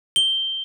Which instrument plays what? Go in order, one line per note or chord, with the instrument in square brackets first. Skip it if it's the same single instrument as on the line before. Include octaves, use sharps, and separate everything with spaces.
[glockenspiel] G7